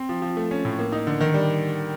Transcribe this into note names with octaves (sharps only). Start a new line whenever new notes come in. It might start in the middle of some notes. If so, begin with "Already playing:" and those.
Already playing: C4
F3
F3
A3
C#4
A2
A#3
D#4
D3
D#3
G3